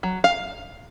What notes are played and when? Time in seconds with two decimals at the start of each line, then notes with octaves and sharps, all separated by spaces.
0.03 F#3
0.24 F5